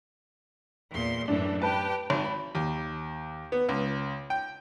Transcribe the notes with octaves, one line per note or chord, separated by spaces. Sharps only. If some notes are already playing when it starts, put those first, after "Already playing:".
E2 A#2 C6
F#2 A2 E3 D4
G4 B4 G5 A5
G#1
B5
D#2
B3
C#2
G5